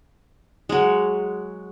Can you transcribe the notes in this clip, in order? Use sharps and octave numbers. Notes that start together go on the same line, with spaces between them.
F#3 G#3